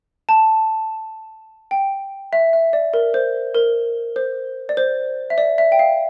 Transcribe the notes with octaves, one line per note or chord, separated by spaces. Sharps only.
A5
G5
E5
E5
D5
A#4
C5
A#4
C5
D5
C5
E5
D5
E5
G5
F5